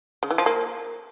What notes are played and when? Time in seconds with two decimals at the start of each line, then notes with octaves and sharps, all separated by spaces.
0.23 C#3
0.31 E3
0.38 F3
0.46 A#3